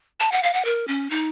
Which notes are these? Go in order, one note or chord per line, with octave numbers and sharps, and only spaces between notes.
A5
F#5
F5
F#5
A#4
C#4
D#4